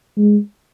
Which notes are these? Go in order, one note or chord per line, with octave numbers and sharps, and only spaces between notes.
G#3